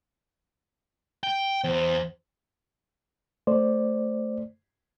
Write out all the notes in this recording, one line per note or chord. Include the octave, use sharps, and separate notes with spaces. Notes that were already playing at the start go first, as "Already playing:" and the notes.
G5
E2 C5
A3 C5 D5